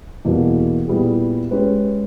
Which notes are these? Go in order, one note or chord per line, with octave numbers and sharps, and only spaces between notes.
E2 B2 G3 A#3
A#2 G3 B3 E4 G#4
G#3 C#4 G4 B4